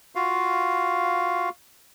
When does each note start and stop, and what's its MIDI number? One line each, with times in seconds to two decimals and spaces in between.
0.15 1.49 65
0.15 1.49 66
0.15 1.49 77